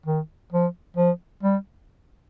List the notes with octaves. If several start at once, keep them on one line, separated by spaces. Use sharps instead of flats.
D#3
F3
F3
G3